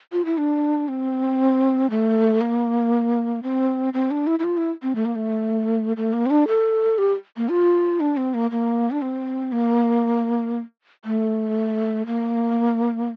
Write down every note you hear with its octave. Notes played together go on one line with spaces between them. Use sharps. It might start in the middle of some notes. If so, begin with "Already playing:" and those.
F4
E4
D4
C4
A3
A#3
C4
C4
D4
E4
E4
F4
E4
C4
A3
A#3
A3
A3
A#3
C4
D4
A4
G4
A#3
F4
D4
C4
A#3
A#3
D4
C4
A#3
A3
A#3